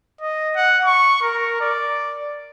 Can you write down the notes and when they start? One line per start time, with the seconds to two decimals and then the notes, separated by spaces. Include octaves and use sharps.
0.21 D#5
0.56 F#5
0.85 C#6
1.22 A#4
1.61 D5